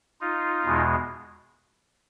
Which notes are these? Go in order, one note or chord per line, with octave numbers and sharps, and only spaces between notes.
D#4 F4
E2 B2 G#3